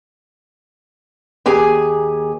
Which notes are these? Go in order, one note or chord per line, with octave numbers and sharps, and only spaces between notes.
D#2 G4 G#4 G#5